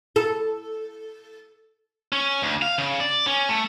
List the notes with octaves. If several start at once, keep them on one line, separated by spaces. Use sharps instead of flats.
A4
C#4
D2
F5
C#3
D5
C#4
A3